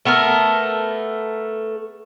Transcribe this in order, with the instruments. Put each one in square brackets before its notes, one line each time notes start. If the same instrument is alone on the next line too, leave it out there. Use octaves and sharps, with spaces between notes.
[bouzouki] A3 B3 A4 A#4